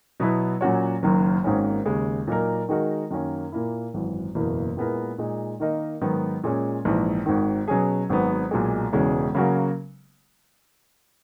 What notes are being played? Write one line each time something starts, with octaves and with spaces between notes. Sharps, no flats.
B2 F#3 B3 E4 B4
A#2 F#3 C#4 F#4 C#5
F#1 F#2 D#3 F#3
G#1 G#2 D#3 A#3 C#4
D#2 C#3 G#3
A#2 F#3 A#3 D#4 A#4
D#3 G#3 D#4 F#4 A#4
F#2 D#3 F#3 A#3 C#4
A#2 A#3 E4
G#1 F#2 E3
F#1 E2 B2 A#3 E4
A#2 G#3 B3 E4 A#4
A#2 G#3 D#4
D#3 A#3 D#4 A#4 D#5
G#2 D#3 F#3 B3
A#2 G#3 C#4
A#1 G#2 E3
G#1 G#2 D#3
B2 F#3 C#4 G#4
G#1 G#2 F#3 B3
B1 A#2 G#3
E1 E2 C#3 G#3 C#4
C#3 F#3 A#3 C#4 F#4